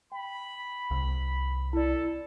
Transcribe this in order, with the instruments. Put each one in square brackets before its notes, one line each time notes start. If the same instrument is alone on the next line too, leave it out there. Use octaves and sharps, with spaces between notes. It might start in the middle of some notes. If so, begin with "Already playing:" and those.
[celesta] G5 [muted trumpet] B5
[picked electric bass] C2
[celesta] E4 D5 [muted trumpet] A4